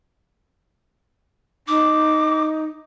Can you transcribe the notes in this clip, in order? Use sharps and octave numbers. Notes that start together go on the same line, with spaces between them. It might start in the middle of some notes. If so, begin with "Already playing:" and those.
D#4 D6